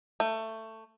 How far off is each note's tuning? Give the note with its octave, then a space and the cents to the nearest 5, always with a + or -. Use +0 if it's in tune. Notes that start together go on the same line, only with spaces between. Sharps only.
A3 +15